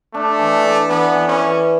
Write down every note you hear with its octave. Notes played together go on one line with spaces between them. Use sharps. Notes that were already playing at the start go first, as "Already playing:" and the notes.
A3 D4
E3
D4
E3 B3
E3
C#4
E3